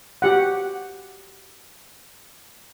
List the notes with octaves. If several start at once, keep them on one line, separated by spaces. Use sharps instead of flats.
F#4 G4 F#5